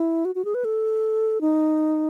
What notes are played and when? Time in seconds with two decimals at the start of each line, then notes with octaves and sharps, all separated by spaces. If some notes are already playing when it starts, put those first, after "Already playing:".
Already playing: E4
0.25 F#4
0.35 F#4
0.45 G#4
0.54 B4
0.65 A4
1.41 D#4